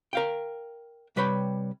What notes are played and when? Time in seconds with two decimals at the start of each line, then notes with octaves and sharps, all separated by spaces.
0.13 A#4 F5 G5
1.16 C3 G3 B4 C#5 G5 B5